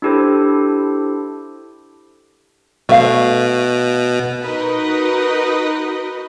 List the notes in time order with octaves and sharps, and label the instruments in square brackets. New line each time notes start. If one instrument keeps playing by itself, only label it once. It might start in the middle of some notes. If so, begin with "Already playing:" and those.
[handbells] D4 E4 G4 A4 C5
[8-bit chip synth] B2 [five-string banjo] A3 F5
[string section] D#4 F#4 A#4 B4 D#5